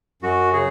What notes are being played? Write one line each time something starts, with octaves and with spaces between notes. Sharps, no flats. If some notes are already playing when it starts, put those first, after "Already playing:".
F#2 F#4
C#3 G#4